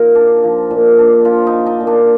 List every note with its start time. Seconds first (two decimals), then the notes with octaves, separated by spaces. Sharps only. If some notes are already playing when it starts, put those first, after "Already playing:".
Already playing: A#2 F3 A#3 D#4 A#4 C5
0.15 D4
0.44 F3
0.71 A#2
0.99 D4
1.25 F3 F4
1.47 D#4
1.53 D4
1.66 D#4
1.80 A#2
1.87 D4